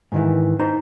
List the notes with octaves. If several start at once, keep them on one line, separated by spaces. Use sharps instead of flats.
G#2 D#3 E3
D#4 C5 A#5